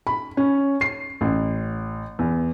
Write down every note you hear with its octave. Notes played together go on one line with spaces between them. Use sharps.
B5
C#4
C7
A1
E2